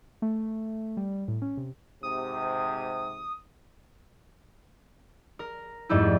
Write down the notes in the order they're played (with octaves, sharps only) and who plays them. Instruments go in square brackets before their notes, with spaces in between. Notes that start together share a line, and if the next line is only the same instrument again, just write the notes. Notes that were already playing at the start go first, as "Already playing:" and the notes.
[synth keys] A3
G3
A2
C#4
C3
[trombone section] G#2 C3 [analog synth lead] D#6
[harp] A#4
F2 G#2 G3 A3 E4